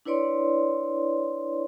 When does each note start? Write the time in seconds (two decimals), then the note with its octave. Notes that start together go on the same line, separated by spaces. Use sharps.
0.05 D4 E4 B4 C#5 D5 C6